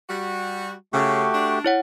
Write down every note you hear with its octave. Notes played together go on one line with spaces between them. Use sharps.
G3 F#4
C#3 A3 F#4 G4
D4
E4 C#5 F#5